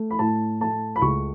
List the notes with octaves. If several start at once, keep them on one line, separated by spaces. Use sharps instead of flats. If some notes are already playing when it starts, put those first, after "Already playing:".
Already playing: A3
B5
A2 A5
A3 A5
B5
C#2 C#6